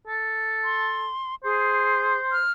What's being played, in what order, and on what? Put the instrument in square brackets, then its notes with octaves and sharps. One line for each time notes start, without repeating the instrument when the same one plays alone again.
[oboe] A4
[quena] C6
[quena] G#4 [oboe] C5
[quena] F6